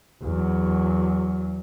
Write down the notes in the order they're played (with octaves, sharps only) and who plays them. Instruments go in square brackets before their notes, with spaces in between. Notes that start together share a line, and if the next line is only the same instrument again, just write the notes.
[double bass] E2 F#3